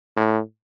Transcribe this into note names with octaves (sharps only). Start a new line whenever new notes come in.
A2